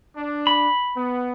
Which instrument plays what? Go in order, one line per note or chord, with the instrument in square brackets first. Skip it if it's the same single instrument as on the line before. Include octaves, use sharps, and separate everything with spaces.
[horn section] D4
[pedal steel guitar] B5
[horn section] B3